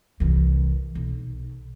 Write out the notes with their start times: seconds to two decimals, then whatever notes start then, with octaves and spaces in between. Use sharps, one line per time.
0.20 C2 E3
0.95 B1